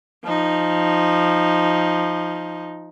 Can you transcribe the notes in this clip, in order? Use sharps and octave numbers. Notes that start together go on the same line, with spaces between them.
F3 D#4